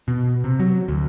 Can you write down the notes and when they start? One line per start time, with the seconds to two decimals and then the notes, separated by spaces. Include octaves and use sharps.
0.08 B2
0.44 C3
0.59 F#3
0.88 D2